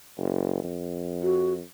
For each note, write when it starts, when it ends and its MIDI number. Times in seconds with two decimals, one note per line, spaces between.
0.18 0.63 30
0.64 1.62 41
1.23 1.52 66